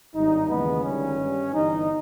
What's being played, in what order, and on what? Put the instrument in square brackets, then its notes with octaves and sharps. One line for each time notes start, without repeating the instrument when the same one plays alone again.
[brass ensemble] G#1 G2 G3 D#4
D#2 C#3 E3 G#3 B3
G1 G2 D#3 G#3 C#4
G2 G3
G1 G2 E3 D#4